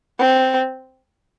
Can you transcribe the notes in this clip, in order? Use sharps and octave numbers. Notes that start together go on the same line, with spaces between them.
C4